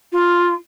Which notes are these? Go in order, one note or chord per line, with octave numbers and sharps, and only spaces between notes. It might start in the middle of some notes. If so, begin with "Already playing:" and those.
F4